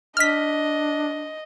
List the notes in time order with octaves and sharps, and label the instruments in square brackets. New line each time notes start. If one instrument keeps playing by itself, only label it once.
[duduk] D4 [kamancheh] D#5 [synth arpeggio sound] F6 B6